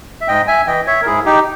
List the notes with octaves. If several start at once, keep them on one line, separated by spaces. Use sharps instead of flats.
E5
G#2 D#5 G5
E5 G#5
E3 D#5 G5
C#5 E5
A#4
G#2 E4 G#4
D#4 G4